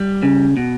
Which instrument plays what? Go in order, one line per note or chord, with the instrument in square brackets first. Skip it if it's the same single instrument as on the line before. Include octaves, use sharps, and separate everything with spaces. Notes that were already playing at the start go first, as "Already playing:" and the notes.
Already playing: [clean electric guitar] G3
C#3
B2